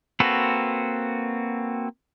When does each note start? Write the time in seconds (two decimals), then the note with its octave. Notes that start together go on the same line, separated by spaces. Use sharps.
0.20 A#3 C4 F#4 A4 B4